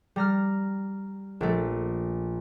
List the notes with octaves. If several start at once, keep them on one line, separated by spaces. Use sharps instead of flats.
G3 A#5 F6
A#1 A3